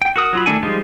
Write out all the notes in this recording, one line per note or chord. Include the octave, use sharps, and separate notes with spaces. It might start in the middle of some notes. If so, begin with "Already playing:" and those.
G5
F#4 A#4 D#6
F#3 F4 B5
D#3 A3 D4 A4 G#5
F3 G3 G#3 D#4 F4